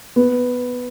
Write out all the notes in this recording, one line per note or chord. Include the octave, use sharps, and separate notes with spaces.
B3